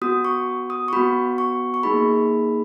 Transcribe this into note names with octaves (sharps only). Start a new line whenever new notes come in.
B3 F#4 D#6
C#6
D#6
C#6
B3 F#4 B5
C#6
C#6
A#3 D#4 G#4 B5